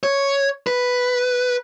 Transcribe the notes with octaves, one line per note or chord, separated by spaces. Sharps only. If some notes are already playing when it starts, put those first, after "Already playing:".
C#5
B4